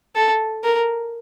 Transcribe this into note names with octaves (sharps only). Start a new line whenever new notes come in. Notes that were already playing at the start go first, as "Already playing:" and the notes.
A4
A#4